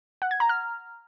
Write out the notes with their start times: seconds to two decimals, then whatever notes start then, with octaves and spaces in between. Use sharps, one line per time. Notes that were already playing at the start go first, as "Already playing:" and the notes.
0.22 F#5
0.31 G#6
0.40 A#5
0.49 F6